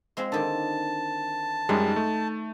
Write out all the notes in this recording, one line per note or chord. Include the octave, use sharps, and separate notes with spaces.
G#3 C4 F4
D3 D#3 A5
F#2 G3 G#3 D#4
A3